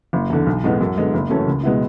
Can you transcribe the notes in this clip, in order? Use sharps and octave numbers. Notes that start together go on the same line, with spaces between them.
F#1
E2 D3
B1
A2 G#3 B3
F#2
D3 G#3 B3
F#1
F#2 E3 A3 C#4
C#2
B2 G#3 B3 E4